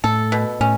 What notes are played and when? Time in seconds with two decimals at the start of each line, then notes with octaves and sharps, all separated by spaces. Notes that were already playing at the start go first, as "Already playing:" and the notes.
0.04 A2 A4
0.32 B2
0.60 A2 C#4